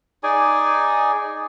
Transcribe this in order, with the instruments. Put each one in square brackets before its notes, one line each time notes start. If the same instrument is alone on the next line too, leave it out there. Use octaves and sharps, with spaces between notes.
[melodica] D#4 G#4 D5 G#5